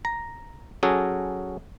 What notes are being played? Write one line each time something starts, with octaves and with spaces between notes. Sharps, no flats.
A#5
F#3 C#4 F#4 G#4 A4